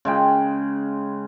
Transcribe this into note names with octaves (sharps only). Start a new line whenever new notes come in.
C#3 G#3 G5